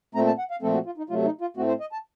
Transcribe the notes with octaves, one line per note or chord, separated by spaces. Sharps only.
A#2 A3 C4 A#5
A5
F#5
F5
A#2 F3 A3 C4 A4
F#4
F4
D#4
C3 F#3 A3 F4
D#4
F4
A2 A3 C4 F#4
C5
D#5
A5